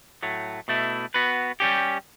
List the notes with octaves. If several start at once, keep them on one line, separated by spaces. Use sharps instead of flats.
A2 F#3 A3
B2 A3 E4
B3 F#4 B4
G3 C#4 G4